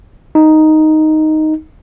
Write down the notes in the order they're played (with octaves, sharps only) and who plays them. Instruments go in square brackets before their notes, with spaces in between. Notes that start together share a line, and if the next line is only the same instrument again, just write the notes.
[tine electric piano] D#4